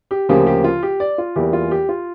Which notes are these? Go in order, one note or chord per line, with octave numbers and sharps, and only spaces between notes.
G4
D2 C#3 F3 A#3 G4
G4
F4
G4
D5
F4
E2 E3 G3 A#3 G4
F4
G4
F4